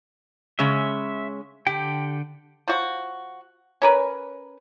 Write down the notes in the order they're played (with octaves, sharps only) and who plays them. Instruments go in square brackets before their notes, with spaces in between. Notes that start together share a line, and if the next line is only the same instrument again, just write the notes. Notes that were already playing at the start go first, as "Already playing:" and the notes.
[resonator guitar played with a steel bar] C#3 G#3 C#4 [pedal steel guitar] E5
[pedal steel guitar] D3 G5 [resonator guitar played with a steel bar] G4
[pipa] F3 F#4
C#4 A#4 B4